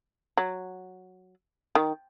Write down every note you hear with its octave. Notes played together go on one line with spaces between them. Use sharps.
F#3
D#3